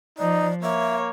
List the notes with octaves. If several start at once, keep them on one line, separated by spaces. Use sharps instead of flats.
F3 D#4 D5
A#3 C#5 E5